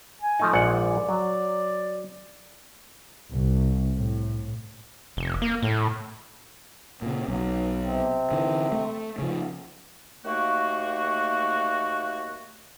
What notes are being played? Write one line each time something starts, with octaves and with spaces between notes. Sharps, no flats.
G#5
F3 A3 D#4
A#1 G#2 D5 F#5
F#3
C2
A2
F1
A#3
A2
A#2 C#3
B1 F#3
C3 C4
D3 E3
A3
C#3 F3
D#2 A3 A#3 F#4